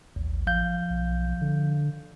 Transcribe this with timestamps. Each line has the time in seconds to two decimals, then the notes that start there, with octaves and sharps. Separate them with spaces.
0.16 A1 D#2
0.47 F3 F5 G6
0.90 B1
1.41 D3